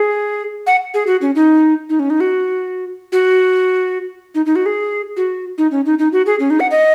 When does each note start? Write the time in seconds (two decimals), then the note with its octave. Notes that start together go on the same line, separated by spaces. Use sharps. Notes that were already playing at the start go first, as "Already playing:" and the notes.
Already playing: G#4
0.67 F#5
0.94 G#4
1.07 F#4
1.22 C#4
1.35 D#4
1.90 D#4
1.99 C#4
2.10 D#4
2.20 F#4
3.12 F#4
4.35 D#4
4.46 D#4
4.56 F#4
4.66 G#4
5.17 F#4
5.58 D#4
5.72 C#4
5.86 D#4
5.99 D#4
6.13 F#4
6.26 G#4
6.40 C#4
6.50 D#4
6.60 F#5
6.71 D#5